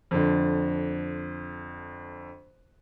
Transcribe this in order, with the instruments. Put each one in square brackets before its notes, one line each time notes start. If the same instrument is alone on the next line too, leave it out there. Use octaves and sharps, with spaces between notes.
[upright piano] F2 D3